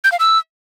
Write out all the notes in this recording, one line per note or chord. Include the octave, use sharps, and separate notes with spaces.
G6
F5
E6